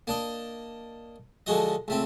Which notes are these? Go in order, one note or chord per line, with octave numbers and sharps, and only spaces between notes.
A#3 D4 D#5
D3 F3 G#3 F#4 D#5
C#2 A3 C4